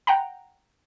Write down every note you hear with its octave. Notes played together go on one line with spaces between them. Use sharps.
F#5 G5 A#5